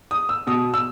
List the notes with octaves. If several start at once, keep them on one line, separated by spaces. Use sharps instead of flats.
D#6
E6
B2 D#6
E6